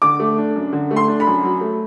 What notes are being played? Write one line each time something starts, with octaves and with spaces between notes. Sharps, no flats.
D3 D6
A3
D4
F#2
D3
A3
C6
D4
B5
F#2
F#3
A3